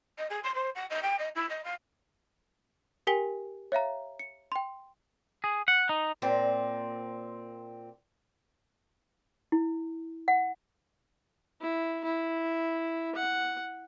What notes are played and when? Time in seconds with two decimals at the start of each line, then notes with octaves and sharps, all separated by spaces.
0.18 D#5
0.30 G#4
0.43 C6
0.54 C5
0.75 F#5
0.90 D#5
1.03 G5
1.19 D#5
1.35 E4
1.49 D#5
1.64 F5
3.07 G4 A#4 G5 G#5 B6 G7
3.72 C#5 E5 F5 A#5
4.19 C#7
4.52 G5 C6
5.44 G#4
5.68 F#5
5.89 D#4
6.22 A#2 C4
9.52 E4
10.28 F#5
11.61 E4
12.04 E4
13.15 F#5